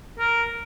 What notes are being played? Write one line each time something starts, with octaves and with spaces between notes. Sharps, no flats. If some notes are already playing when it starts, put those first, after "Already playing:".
A#4